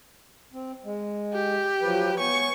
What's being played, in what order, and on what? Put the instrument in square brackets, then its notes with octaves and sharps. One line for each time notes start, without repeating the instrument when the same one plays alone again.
[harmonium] C4
G#3
[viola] G4
[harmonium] F3 F#3 B4
[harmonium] B3 C#5 G#5 [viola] C#6